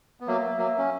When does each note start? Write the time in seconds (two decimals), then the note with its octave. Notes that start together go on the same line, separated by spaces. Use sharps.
0.20 B3
0.27 F#3 A#3 E5
0.58 F#3 A#3
0.78 C#4